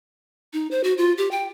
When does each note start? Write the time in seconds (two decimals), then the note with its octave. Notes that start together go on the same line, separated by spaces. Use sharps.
0.53 D#4
0.71 C5
0.84 F#4
0.98 F4
1.18 G4
1.31 G5